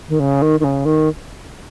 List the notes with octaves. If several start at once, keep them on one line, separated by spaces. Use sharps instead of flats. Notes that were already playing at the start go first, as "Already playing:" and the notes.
D#3
C#3
D#3
D#3
C#3
D#3